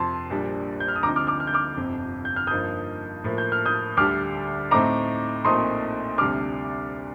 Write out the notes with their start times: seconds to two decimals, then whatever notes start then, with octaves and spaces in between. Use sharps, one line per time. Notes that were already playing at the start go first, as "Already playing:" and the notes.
Already playing: F2 C3 F3 A5 C6
0.30 A#1 A#2 G3 D4
0.80 G6
0.88 F6
0.96 D#6
1.03 D2 D3 F3 C4 D#4 A#5 D6
1.16 D6 F6
1.27 D6 F6
1.40 F6
1.47 G6
1.54 D6 F6
1.77 G1 F2 C3
2.25 G6
2.36 F6
2.47 G2 F3 A#3 D#4 D#6 G6
3.24 A2 F3 A#3
3.38 G6
3.52 F6
3.66 D#6 G6
3.97 D2 D3 G3 D4 D6 F6
4.71 A2 A3 C4 D#4 A#5 D6
5.45 A#1 A#2 A3 C4 D#4 C6 D#6
6.18 D2 C3 G3 D4 D6 F6